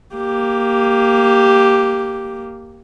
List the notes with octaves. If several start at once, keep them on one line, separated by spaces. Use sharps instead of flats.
A#3 G4